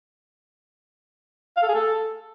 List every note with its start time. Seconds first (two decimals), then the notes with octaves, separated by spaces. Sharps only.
1.57 F5
1.63 A4
1.68 G#4
1.74 A4